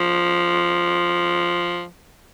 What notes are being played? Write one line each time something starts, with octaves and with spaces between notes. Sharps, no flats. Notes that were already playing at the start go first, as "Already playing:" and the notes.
Already playing: F3